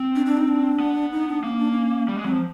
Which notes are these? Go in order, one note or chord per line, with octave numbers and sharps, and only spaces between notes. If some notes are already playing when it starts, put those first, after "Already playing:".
Already playing: C4
D4
D4
D#4
D4
B3
D#4
D4
A#3 C#4
D4
C#4
G3
G#3
F#3 C4
F3